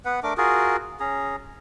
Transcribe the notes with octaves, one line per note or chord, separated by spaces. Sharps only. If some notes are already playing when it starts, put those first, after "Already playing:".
B3 B4 F#5
A3 D4 A#4 D6
F4 F#4 G#4 A#4
C#4 G#4 A#5